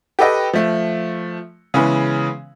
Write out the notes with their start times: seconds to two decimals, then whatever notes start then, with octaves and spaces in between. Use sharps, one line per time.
0.19 G4 A4 B4 D#5 G5
0.53 F3 A3
1.74 C#3 E3 G#3 B3 C#4